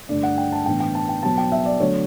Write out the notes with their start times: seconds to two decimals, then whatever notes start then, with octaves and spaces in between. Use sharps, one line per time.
0.09 G2 D3 A3 D4 D5
0.23 F#5
0.38 G5
0.52 A5
0.66 A2 E3 B3 D4 G5
0.80 G5
0.95 A5
1.09 G5
1.23 B2 F#3 B3 A5
1.38 G5
1.52 E5
1.66 D5
1.80 D3 F#3 A3 C#5